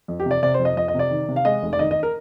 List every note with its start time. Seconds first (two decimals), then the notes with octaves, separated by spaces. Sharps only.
0.08 F2
0.20 G4
0.26 C3
0.31 D5
0.43 C3 D5
0.54 C5
0.59 F2
0.65 D#5
0.76 F2 D#5
0.88 D#5
0.95 C3 D5
1.11 D#3
1.28 C3
1.36 F5
1.45 G#3 D#5
1.62 F1
1.73 D5
1.79 D#3 D#5
1.91 D#5
2.03 A#4